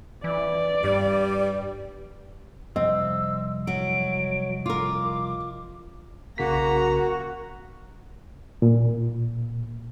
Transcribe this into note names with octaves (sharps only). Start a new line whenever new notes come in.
E3 D5
G2 G3
C2 F2 C4 D#5 E6
F#3 D7
F4 A#4 D6
B1 C#3 A#3 F#4 A#5 B6
A#2